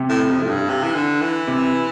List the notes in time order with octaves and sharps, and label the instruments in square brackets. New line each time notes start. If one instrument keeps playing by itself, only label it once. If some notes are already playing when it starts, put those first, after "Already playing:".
Already playing: [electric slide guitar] C3
[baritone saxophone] A2
F2
A2
G2
C3
E3
D3
E3
[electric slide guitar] C3